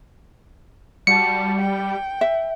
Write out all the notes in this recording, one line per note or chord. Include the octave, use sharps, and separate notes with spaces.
G3 F#4 A5 C#7
G5
E5